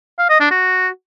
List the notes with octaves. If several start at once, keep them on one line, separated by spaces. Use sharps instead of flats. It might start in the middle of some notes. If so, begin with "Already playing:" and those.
F5
D#5
D4
F#4